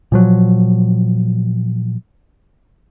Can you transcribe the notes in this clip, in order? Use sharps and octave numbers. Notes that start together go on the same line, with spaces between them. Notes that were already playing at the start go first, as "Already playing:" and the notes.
A#2 F3 F#3